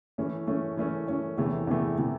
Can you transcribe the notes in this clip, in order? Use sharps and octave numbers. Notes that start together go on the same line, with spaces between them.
E3 A3 C#4
E3 A3 C#4
E3 A3 C#4
E3 A3 C#4
E2 C3 E3 A3
E2 C3 E3 A3
C3 E3 A3